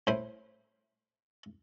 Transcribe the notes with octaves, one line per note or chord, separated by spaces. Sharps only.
A2 C5 B5